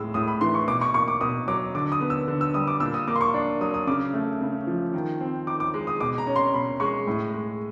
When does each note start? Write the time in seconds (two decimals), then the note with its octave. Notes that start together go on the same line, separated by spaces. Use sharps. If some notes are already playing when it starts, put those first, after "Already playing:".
Already playing: A2 G#3 E6
0.14 A2 D#6
0.28 B5
0.41 E3 C6
0.54 C#6
0.68 B2 D6
0.81 C#6
0.94 A#3 C#6
1.08 D6
1.21 B2 D#6
1.48 F#3 D6
1.75 D3 D6
1.92 D#6
2.01 B3
2.10 E6
2.28 D3
2.41 E6
2.54 G3 D#6
2.67 D6
2.80 A#2 E6
2.94 D#6
3.08 A#3 D6
3.15 C6
3.21 C#6
3.34 D4
3.61 F#3 D#6
3.74 D#6
3.87 C#3 D6
4.14 A3
4.41 C#3
4.67 F3
4.94 D#3
5.20 C4
5.47 D#4 D6
5.60 D6
5.74 G#3
5.87 D#6
6.00 B2 D6
6.18 A#5
6.27 C#4
6.36 C6
6.54 B2 B5
6.80 G#3 C#6
7.07 A2
7.33 G#3